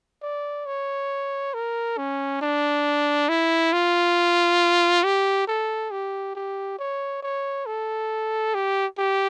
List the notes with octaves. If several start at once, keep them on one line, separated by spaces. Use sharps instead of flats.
D5
C#5
A#4
C#4
D4
E4
F4
G4
A4
G4
G4
C#5
C#5
A4
G4
G4